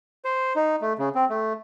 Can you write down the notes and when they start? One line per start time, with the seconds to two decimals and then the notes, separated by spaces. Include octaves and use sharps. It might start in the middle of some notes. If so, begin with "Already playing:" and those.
0.25 C5
0.56 D#4
0.81 A3
0.98 C#3
1.15 C4
1.30 A3